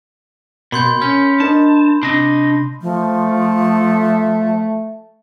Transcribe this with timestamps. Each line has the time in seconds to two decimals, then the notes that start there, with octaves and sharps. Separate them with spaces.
0.72 B2 A#4 B5 C6 G6
1.02 C#4 G6
1.40 D4 A#4 D#5 A5
2.03 C3 D4 D#5
2.82 F3 A3